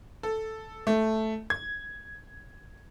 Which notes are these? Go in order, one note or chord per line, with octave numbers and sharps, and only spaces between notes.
A4
A3
G#6